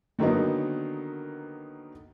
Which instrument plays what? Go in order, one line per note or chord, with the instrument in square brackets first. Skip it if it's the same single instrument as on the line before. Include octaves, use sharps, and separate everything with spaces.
[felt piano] D3 D#3 F#3 A#3 B3 D#4